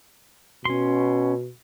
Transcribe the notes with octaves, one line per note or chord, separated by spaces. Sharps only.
B2 C#4 C6